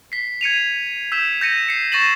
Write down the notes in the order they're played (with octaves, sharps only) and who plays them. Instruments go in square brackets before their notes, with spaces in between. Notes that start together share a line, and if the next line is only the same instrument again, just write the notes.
[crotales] B6 C7
G#6 C#7 D#7 F7
E6 G6 B6 E7
G6 A#6 C#7 D#7
C7 C#7
C#6 A6 A#6 D#7 E7 F#7